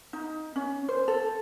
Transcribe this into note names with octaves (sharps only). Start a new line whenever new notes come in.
D#4
C#4
C5
A4